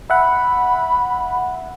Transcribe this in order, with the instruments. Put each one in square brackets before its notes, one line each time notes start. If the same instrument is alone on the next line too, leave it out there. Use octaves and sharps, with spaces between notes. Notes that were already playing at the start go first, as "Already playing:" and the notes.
[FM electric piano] E5 F#5 [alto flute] B5